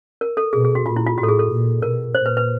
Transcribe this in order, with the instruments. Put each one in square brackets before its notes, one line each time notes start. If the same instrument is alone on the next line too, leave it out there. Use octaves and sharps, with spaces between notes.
[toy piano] A#4
A4
[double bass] B2 [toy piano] G#4
[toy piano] G#4
F#4
[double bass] A#2 [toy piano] F4
[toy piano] E4
F4
[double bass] A2 [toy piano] F#4
[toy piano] A4
G#4
A4
[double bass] A#2
[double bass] B2 [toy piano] A#4
[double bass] A#2 [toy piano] C5
[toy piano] B4
B4